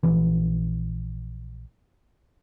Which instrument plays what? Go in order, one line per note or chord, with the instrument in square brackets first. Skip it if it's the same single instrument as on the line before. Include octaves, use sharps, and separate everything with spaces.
[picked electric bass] A#1 E3